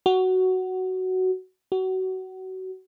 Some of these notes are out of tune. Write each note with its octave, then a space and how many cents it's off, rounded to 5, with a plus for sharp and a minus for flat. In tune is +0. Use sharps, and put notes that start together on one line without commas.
F#4 +10
F#4 +25